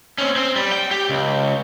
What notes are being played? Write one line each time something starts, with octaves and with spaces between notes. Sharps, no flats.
C4 C#4
C4
G3
G5
G4
C#2